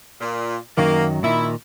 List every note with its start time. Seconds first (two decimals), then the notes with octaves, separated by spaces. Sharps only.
0.21 A#2
0.77 F#2 D#3 F#3 A#3
1.23 A#2 D#3 E4